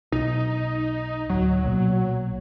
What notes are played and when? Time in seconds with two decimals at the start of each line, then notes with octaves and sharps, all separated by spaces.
0.12 B1 D#4
1.30 D1 F#3
1.64 B1 A#2